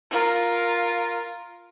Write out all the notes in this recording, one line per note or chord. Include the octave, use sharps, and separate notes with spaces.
F4 A#4